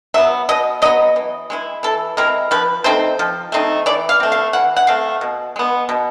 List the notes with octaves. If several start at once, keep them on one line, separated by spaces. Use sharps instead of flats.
F#3 B3 E5
B2 D#5
F#3 B3 D#5
E3
G#3 C4 E4
E3 A4
G#3 C4 E4 A#4
F3 B4
A3 C4 D#4 C5
F3
A3 C4 D#4
E3 D5
F5
A3 C4
F5
E3 F#5
F#5
A3 C4 F5
B2
G#3 B3
B2